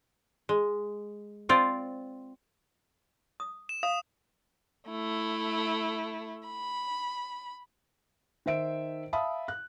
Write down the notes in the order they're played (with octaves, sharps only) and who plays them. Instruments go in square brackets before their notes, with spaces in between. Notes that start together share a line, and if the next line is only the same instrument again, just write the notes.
[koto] G#3
C4 F4 D5
[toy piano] D#6
[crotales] E7
[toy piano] F5 [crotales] D#6
[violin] A3 E4
B5
[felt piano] D#3 C5 E5 D7
E5 F5 A5 B5 D#6
F#6